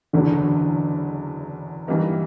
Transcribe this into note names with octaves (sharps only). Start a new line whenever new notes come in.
F#1 E2 B2 D3 F#3 B3
G2 E3 G3 A#3 D#4